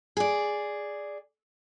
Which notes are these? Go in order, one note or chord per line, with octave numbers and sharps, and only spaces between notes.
G#4 D5